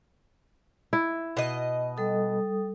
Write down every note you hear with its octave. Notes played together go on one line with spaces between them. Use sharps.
E4
B2 D#5
G3 A4 D#6